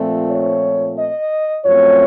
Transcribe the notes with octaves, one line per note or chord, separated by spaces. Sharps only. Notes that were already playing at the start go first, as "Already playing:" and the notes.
Already playing: A#2 F3 A3 C4
C#5
D#5
F#2 F3 A3 C4 C#5